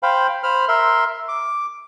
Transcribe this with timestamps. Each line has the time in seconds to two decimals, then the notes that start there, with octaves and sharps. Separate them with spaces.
0.03 C5 F5 G5 B5
0.43 C5 B5 F6
0.68 A#4 E5 C6
1.28 D6